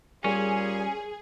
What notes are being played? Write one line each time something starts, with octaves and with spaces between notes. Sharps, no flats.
A#2 G3 C#4 G#4